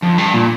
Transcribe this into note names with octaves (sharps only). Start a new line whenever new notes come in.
F2
G2
A#2